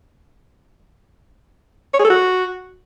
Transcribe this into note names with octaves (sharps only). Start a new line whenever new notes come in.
C#5
G#4
A4
F#4